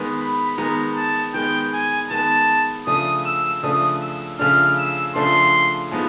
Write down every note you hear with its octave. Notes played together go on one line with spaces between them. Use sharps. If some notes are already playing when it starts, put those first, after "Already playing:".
Already playing: D#3 G#3 B3
B5
D#3 G#3 B3 A#5
A5
D#3 G#3 B3 G5
G#5
D#3 G#3 B3 A5
C#3 F3 A3 D4 D#6
E6
C#3 F3 A3 D4 D#6
E6
C#3 F3 A3 D4 F6
E6
C#3 F3 A3 D4 C6
F3 G#3 B3 D#4